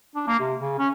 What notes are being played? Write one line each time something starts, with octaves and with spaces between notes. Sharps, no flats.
D4
A#3
C3
C#3
C#4